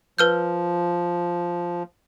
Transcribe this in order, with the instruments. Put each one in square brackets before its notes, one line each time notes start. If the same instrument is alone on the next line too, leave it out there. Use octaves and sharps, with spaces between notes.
[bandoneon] F3 [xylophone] B4 F6 G6